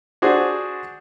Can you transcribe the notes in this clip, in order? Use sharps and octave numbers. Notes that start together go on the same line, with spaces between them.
D4 F#4 G#4 C5